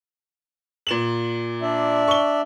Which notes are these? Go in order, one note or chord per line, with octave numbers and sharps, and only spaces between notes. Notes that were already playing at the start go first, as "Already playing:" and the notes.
A#2 E7 F#7
D4 D5 E5
C#6 G7